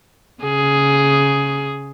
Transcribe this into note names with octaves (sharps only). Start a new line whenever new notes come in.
C#3 G#4